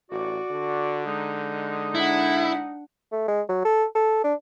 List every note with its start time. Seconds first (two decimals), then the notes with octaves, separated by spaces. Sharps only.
0.11 A1 F#4 D5
0.50 D3
1.06 G#3 D#4
1.95 D4 E4 F#5
3.12 A3
3.28 G#3
3.49 F#3
3.65 A4
3.95 A4
4.24 D4